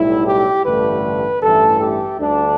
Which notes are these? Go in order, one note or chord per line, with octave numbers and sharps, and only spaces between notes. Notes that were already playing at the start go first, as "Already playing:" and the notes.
Already playing: B1 A2 G3 E4
G4
A1 G2 D3 A3 B4
A1 G2 E3 A3 A4
G4
D2 D3 G3 D4